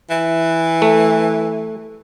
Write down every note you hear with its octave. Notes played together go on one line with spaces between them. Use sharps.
E3
A3